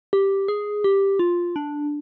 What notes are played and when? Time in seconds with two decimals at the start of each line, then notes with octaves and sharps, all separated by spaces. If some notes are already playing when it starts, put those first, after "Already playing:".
0.13 G4
0.48 G#4
0.84 G4
1.19 F4
1.56 D4